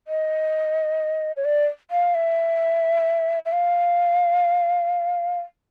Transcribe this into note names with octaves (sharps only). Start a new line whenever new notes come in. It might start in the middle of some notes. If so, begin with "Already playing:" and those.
D#5
C#5
D5
F5
E5
E5
F5